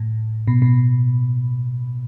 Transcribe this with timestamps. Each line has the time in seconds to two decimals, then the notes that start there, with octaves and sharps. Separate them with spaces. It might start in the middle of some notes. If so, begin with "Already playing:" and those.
Already playing: A2
0.47 B2
0.62 B2